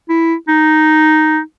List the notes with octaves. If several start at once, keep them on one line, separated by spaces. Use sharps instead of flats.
E4
D#4